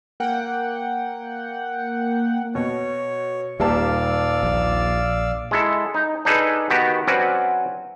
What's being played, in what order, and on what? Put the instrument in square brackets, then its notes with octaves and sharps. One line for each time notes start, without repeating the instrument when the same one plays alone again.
[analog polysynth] A#3 F#5 G5
[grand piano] B2 [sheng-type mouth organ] C#5
[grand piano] D#1 A#3 A5 [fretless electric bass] G3 [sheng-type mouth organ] D5 F5 E6
[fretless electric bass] A#1
[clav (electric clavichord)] G#3 E4 A4
D#4
D4 D#4 G#4 A4 B4
D#3 B3 F#4 G4
F#3 C4 C#4 F#4 B4 D5